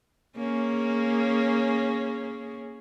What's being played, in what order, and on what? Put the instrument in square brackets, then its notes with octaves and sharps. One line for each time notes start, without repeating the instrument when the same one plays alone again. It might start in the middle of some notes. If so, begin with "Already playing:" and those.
[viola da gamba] A#3 C#4 G#4